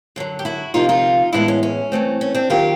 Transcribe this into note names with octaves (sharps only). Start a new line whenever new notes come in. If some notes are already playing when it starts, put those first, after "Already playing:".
F#2 D3 F#3
G4
E4 F#4
D2 C3 F3 A#3 D#4 F4
D#4 F4
A2 E3 G#3 B3 D4 E4
C#4
C#4
G2 E3 A3 C4
C#4
C4 D4
D#3 F#3 A#3 F4 G4